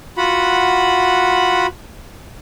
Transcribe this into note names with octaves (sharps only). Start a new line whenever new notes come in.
F4 F#4 F#5 B5